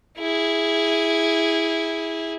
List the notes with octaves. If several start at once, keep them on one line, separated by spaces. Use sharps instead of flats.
E4 G#4